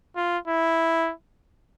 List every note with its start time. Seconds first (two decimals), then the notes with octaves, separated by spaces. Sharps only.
0.16 F4
0.47 E4